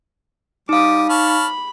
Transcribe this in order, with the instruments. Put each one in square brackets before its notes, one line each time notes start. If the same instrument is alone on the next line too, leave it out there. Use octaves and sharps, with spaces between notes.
[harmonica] G3 [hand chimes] D#4 F5 [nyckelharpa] D6 D#6
[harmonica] C#5 A5 F6 [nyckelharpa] B5